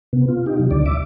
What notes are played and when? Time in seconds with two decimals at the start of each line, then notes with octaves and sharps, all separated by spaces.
0.13 C3 B3
0.28 F4
0.46 D#4 G4
0.60 C3 F#3
0.71 D2 D3 D5
0.86 E5 D6